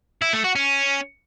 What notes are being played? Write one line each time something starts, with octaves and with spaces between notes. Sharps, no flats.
E4
A3
F#4
C#4